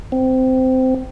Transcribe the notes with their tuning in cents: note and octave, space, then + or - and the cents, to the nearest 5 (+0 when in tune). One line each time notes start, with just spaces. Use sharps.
C4 -15